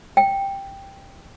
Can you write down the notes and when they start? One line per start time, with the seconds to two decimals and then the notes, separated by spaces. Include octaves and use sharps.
0.17 G5